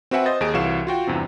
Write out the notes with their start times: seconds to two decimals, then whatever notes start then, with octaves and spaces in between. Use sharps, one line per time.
0.11 C4 F#4 B4 E5 F#5 G#5
0.26 C5 D#5 A6
0.41 D#2 D#4 G#4 D7
0.54 C2 E3 F#4 C#5 F5 E7
0.87 F4 F#4 G5
1.07 E2 G2 C3